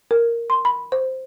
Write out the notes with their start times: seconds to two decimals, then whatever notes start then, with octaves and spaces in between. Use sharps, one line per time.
0.11 A#4
0.50 C6
0.65 B5
0.92 C5